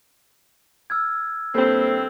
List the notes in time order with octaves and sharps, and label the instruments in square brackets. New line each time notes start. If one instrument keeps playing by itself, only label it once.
[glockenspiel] E6 F6 G#6
[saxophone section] G2 C4 [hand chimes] A#3 A4